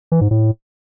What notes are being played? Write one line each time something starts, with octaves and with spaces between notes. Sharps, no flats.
E3
G#2
A2